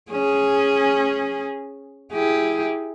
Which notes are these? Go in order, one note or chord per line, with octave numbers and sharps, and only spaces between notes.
C#4 G#4
E4 G4 G#4